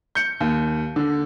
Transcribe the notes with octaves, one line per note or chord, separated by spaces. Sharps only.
G6 C#7
D#2
D3